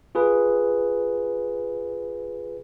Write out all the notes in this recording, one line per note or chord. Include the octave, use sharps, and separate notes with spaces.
F4 G#4 B4